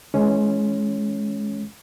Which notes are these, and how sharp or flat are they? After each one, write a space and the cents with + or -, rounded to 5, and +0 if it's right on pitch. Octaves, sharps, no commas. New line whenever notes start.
E3 +0 G#3 +25 C#4 +0